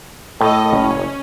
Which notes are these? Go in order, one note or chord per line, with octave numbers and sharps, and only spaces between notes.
A2 A4 D#5
F#1 C#4